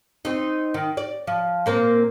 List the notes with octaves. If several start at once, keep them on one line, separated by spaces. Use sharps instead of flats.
C4 D#4
D#3
D5
F3
A#2 A#3 C4